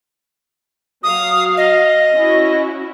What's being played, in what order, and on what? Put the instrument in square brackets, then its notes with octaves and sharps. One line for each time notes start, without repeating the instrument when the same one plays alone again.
[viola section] F#3 F5 [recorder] D#6
[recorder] D#5
[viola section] C#4 E4 F#4